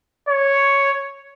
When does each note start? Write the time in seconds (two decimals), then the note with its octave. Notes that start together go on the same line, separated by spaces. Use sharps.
0.28 C#5